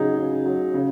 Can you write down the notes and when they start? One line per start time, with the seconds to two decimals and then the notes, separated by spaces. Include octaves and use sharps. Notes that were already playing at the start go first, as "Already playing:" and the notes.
Already playing: C#3 F#3 D#4 G#4
0.18 C#3
0.46 F#3
0.74 C#3